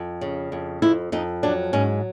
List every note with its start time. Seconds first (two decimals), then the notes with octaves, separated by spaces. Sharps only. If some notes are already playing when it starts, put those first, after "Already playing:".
Already playing: F2
0.21 C#3
0.52 F2
0.82 F2 E4
1.12 F2 D#4
1.43 F#3 D4
1.73 G#2 C#4